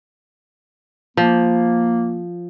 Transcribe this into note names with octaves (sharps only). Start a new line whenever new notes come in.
F3 A#3